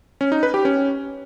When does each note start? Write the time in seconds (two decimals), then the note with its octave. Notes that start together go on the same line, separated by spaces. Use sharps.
0.21 C#4
0.32 D#4
0.43 B4
0.54 G4
0.65 C#4